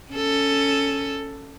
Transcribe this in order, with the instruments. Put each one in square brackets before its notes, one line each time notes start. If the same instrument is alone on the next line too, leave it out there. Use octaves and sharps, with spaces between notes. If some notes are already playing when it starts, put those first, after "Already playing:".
[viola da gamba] C#4 A4